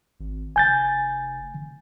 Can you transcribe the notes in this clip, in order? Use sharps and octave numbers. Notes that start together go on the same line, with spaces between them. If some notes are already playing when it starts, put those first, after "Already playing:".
G#1
F1 G#5 G6 A6